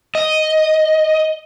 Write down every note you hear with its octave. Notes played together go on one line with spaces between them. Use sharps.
D#5